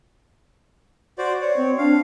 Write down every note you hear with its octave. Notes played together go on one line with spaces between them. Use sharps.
F#4 C5 D5
C#5 D5
C4
D4 F5